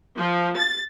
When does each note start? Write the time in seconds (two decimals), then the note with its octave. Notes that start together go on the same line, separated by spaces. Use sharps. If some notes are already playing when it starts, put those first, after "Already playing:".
0.18 F3
0.57 A6